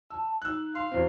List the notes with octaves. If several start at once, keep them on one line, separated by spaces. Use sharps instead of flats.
A5 E6
D#4 E6 F#6
F5 C6
E2 C4 F#4